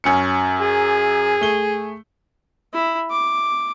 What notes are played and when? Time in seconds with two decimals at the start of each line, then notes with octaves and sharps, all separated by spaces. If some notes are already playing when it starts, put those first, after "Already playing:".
0.04 F#2 C#4 C#7
0.61 G#4
1.41 A3 G7
2.74 E4
3.11 D6